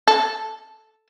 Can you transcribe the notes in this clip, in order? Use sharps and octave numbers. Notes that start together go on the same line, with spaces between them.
A4